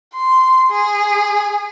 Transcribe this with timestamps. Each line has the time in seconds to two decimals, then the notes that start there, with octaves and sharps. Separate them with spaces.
0.14 C6
0.70 G#4